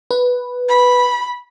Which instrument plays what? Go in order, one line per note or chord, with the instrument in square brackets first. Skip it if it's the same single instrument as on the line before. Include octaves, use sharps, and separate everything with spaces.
[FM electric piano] B4
[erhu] B5